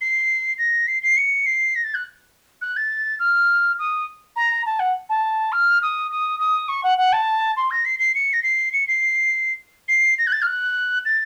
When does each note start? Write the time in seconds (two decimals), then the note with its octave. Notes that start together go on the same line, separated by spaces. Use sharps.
0.01 C7
0.58 A#6
0.87 C7
1.03 C7
1.17 C#7
1.46 C7
1.75 A#6
1.84 A6
1.94 F#6
2.61 F#6
2.76 A6
3.19 F6
3.79 D#6
4.36 A#5
4.66 A5
4.79 F#5
5.09 A5
5.52 F6
5.82 D#6
6.11 D#6
6.39 D#6
6.68 C#6
6.83 F#5
6.98 F#5
7.13 A5
7.56 C6
7.71 A#6
7.85 C7
7.99 C7
8.15 C#7
8.33 A#6
8.43 C7
8.73 C#7
8.87 C7
9.88 C7
10.18 A#6
10.27 F#6
10.32 A6
10.42 F6
10.46 F#6
11.05 A6